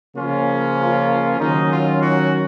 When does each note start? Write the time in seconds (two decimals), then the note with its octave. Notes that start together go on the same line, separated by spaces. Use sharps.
0.16 C#3 F3 A#3 C#4 F4
0.78 F4
1.39 D#3 F#3 C#4 D#4
1.70 F4
2.01 F#4